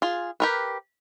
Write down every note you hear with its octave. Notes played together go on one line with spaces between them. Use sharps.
F4 G#4
G4 A#4 B4